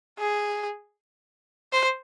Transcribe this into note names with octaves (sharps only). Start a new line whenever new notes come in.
G#4
C5